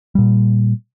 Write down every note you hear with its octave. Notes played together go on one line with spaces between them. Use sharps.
A#2 G3